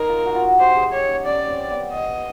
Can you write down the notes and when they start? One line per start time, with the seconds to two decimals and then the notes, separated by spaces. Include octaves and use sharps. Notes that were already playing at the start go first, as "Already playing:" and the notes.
Already playing: D#4 A#4
0.09 F4
0.25 F#4
0.35 F4
0.43 F#4
0.59 G4 C5
0.76 G#4
0.92 G4 C#5
1.10 C#4
1.26 C#4 D5
1.49 C4
1.70 B3
1.92 D#5